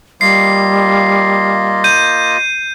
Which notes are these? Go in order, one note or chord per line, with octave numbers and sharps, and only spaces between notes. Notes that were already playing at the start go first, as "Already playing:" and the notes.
G3 A#3 F4 D#5 C7
G6 D#7